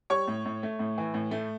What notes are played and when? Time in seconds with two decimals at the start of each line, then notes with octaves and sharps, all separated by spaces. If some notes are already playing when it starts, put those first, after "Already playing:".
0.10 G3 C#5 C#6
0.27 A2
0.45 A2
0.63 A3
0.79 A2
0.98 E3
1.14 A2
1.31 A3